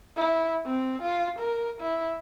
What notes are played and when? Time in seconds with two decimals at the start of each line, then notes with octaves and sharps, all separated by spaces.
0.17 E4
0.66 C4
1.02 F4
1.39 A#4
1.81 E4